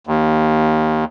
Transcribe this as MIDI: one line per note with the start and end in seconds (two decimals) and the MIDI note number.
0.07 1.05 39